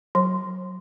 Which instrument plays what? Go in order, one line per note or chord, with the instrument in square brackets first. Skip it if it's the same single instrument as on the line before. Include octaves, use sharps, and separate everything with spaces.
[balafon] F#3